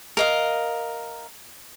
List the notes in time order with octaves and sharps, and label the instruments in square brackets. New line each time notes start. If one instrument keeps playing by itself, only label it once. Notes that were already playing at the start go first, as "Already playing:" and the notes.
[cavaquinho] A#4 D#5 F5